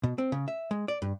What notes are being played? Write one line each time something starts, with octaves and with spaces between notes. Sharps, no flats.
B2
C4
C#3
E5
G#3
D5
G2